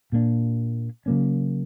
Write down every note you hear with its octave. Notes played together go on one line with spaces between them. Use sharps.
A#2 A#3 D4
C#3 F#3 A#3 C#4